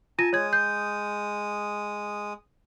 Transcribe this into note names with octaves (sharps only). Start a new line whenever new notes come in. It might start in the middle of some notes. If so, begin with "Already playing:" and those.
F4 G#5 A5 A#6 D#7
G#3 C#5 D#6 G#6
G6